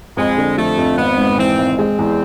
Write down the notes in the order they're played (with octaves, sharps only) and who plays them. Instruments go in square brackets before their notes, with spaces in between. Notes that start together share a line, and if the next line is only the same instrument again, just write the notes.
[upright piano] F2 [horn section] G#3
[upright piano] D3
[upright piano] F3 [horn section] A3
[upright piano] F2
[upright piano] G#1 [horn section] B3
[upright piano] G#2
[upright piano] E3 [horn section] C4
[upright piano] G#1
[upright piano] G#3 [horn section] C4
[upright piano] E2